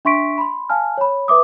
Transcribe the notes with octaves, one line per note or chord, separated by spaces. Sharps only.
D4 E5 C6 C#6 B6 D7
B5 C6
F5 G#5 A5 F6
C#5 B5
B4 E5 D6 D#6